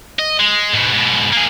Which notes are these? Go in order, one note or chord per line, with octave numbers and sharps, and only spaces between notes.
D#5
G#3
G#2 B2
G#2 B2
A#3 G#4